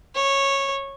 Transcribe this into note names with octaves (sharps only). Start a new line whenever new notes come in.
C#5